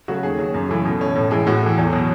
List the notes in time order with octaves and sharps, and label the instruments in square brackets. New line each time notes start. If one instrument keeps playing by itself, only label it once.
[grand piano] C#3 F#3 A3 C#4 F#4
D#2 G#4
D#3 F#3
F#2
C#3 E3 A3
B2
A3 C#4
A2
E3 G#3
A2 F#4
E3 A3
E2
B2 F#3